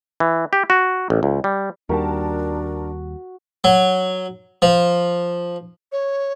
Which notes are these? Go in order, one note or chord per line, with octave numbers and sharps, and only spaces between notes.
E3
G4
F#4
A1
C#2
G3
D#2 G3 D4 F#4 A#4 A5
F#3
F3
C#5